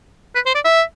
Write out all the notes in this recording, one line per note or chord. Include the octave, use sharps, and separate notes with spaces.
B4
C5
D5
E5